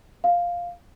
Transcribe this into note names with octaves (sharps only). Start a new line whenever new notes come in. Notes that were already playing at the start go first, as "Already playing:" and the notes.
F5